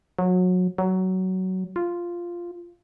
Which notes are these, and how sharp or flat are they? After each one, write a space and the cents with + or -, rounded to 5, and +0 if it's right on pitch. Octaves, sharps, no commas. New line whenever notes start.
F#3 -25
F#3 +15
F4 -5